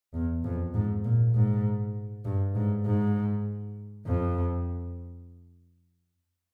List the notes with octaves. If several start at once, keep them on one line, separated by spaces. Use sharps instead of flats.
E2
F2
G#2
A#2
G#2
G2
G#2
G#2
F2